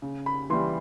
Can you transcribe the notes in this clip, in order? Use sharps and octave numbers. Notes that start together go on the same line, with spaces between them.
C#3
B5
E3 G3 C6